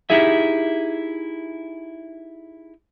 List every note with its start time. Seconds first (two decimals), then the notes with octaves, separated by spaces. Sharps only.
0.10 D#4 E4 G4 G#4 E5